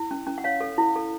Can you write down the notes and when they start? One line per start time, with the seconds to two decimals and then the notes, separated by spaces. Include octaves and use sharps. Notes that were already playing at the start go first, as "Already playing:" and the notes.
Already playing: E4
0.11 C#4
0.27 C#4
0.38 F#5
0.44 C#5 F5
0.61 A4
0.78 E4
0.96 A4